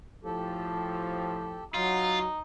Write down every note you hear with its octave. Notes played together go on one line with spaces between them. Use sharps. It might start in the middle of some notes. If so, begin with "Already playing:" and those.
A2 F3 G4 A4
F#3 D#4 F4